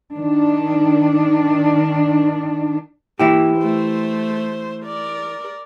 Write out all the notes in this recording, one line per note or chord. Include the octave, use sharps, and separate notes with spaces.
D#3 D4
E3 A#3 E4 G4
A3 C5
A#4 D5